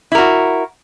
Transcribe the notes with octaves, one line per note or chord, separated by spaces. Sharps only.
E4 F#4 A#4